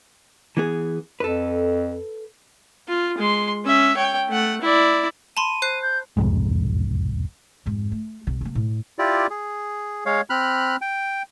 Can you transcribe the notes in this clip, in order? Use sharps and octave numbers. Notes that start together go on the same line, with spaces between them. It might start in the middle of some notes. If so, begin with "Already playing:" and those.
E3 B3 G#4
F2 A4 B4
F4
G#3 C6
C#4 E5
C#5 G5
A3 F#5
E4 D5
A5 B5 C6 D#7
C5 F#6 C7
G6
E1 C2 F2 G#2
F2 G#2
A3
C2 C3
C3 A#3
A2
E4 F4 G4 D5
G#4
G#3 C#5 F5
C4 B5 F6 F#6
G5